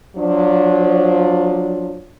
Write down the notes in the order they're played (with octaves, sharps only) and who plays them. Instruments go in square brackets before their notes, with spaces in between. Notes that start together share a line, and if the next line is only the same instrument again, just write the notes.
[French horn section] F3 F#3 D4